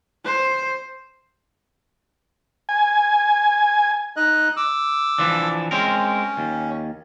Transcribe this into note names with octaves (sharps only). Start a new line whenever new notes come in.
C5
G#5
D#4 D#5 F#6
D6 E6
E3 F3 D4
G#3 C4 C#4 A#4
D#2